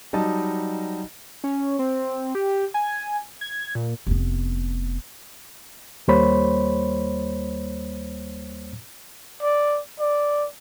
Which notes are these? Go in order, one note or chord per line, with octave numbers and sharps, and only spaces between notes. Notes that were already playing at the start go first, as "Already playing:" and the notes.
F#3 G3 D#4 D#5 A5
C#4
C4
G4
G#5
G#6
A#2
F1 B3
D#2 G3 A#3 C5 C#5 B5
D5
D5